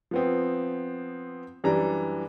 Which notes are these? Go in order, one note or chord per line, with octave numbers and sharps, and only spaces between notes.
F3 B3 C4
F#2 E3 G3 D4 A#5